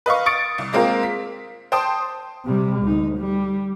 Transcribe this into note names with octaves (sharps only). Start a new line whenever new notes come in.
B4 D#5 F5 C#6
C#6 D#6 A6 C#7 D7
C2
G#3 A#3 C4 F4 A#4
B6
C5 G5 A5 C6 D#6
C3 G3
D2 D#4
G3